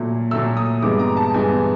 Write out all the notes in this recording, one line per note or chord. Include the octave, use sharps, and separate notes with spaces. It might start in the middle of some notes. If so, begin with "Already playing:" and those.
Already playing: A#2 F#3 A3
A#2 F#3 A3 E6
D#6
G2 E3 G#3 B3 D6
A#5
A5
G2 E3 G#3 B3 G#5